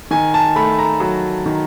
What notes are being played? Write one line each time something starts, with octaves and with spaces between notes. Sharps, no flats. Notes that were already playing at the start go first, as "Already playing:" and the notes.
D#3 G#5
A5
A3 B5
A#5
F#3
D#3